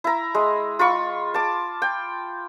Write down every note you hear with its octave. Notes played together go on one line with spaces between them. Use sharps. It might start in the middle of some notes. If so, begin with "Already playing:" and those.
E4 A#5
G#3
F4 B5 C#6
A5 D6
G5